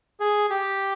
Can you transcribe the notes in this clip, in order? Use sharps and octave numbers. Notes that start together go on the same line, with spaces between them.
G#4
G4